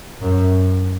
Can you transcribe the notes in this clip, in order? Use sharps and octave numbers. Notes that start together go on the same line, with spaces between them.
F#2